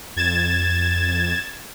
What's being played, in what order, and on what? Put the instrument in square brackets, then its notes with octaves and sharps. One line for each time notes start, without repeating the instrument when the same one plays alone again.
[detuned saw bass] F2 [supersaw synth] G#6 A6 E7